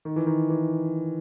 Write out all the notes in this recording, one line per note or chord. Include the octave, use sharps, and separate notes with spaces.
D#3
E3
D#3
E3